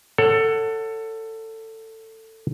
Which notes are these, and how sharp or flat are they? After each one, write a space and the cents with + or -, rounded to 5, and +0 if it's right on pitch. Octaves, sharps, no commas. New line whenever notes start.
A4 +20 C#5 +0 F#5 +0